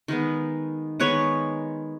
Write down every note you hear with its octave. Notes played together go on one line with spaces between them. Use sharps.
D#3 G#3 B3
D#3 G#3 B3 B4 C#5